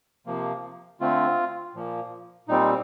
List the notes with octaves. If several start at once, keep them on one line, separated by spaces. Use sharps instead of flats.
C3 F3 A#3
D3 A3 C4 F4
A#2 F3 A#3
A#2 G3 C4 D#4